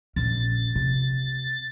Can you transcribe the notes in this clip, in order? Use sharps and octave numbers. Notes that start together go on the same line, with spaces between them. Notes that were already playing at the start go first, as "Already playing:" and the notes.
A#1 C#4 A6
C3